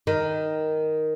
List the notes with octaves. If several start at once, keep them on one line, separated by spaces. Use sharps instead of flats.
D#3